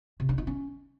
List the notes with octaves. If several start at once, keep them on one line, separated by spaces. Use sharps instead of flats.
C3
D4
D#4
C#4